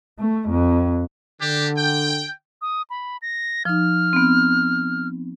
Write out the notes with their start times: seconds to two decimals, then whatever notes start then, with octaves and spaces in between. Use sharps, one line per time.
0.19 A3
0.50 F2
1.41 D3 D4 G4
1.77 G5
2.62 D#6
2.90 B5
3.22 A#6
3.65 F3 D#4 F6
4.13 B3 C4